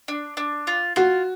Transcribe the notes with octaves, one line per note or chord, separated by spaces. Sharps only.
D4
D4
F4
F4 F#4